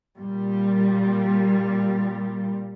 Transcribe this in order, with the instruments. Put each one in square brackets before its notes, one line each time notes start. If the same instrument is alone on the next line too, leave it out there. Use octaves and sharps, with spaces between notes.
[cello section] A#2 G3